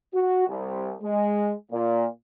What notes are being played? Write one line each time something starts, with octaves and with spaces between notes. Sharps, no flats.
F#4
C2
G#3
A#2